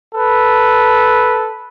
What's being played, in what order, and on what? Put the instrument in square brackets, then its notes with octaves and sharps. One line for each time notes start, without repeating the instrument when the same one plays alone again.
[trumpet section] A4 B4